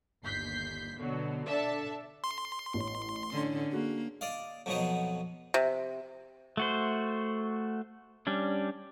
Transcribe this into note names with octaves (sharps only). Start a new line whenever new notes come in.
G1 D#2 G6 B6 C7
B2 D3 F#3
D4 A4 D5 E5 A5
C6
A1 C#5
D3 C#4
A#3 F#4 G#4
D5 D#5 F5
F2 B2 F#3 B3 D#4
C3
A3 F#4 C5
G3 C#4 D4